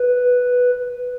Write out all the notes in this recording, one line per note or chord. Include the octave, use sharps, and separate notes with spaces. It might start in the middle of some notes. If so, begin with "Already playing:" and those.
Already playing: B4